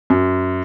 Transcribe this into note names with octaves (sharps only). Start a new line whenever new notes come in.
F#2